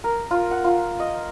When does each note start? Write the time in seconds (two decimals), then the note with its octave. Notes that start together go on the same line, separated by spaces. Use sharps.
0.04 A#4
0.31 F4
0.51 F#5
0.64 F4
1.00 D#5